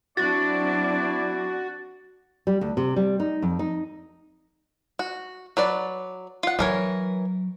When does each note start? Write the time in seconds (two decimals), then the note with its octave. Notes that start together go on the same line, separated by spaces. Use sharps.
0.17 F#3 C4 D4 E4 F#4 D5 A6
2.47 G3
2.61 D2
2.77 C3
2.96 G3
3.20 D#4
3.42 F2
3.59 D#4
4.99 F#4
5.57 F#3 B4 D5
6.43 F4 F#5
6.59 E3 F#3 A#4 C#5